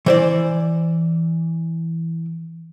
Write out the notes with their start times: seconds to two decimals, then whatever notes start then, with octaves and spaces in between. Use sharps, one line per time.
0.06 E3 C5 D5